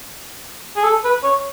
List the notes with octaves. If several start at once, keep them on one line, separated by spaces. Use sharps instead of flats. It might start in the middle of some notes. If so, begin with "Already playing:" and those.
G#4
A4
B4
C#5